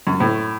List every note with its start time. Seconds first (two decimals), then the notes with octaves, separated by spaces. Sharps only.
0.07 F#2
0.20 A2